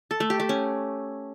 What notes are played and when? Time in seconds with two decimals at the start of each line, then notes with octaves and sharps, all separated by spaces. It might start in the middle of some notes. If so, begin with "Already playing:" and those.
0.11 A4
0.20 A3
0.30 G4
0.40 A3
0.49 C#4